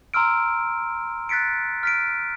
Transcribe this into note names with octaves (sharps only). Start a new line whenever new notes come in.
A#5 C6 E6 F6 D7
F#6 A6 B6 C#7 D7
F6 B6 D7